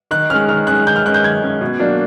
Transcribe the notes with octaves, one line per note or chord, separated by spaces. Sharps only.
D#3 F#6
G#3 C#4 F6
D#3 F6
G#3 C#4 F#6
D#3 G6
F6
G#3 C#4 F#6
G6
D#3 G#6
G#3 C#4
B2
F#3 A#3 D4